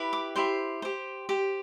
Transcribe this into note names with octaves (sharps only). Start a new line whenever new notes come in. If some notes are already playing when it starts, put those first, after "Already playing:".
Already playing: E4 G4 B4
D6
E4 G4 C5 C6
G4 C5
G4 C5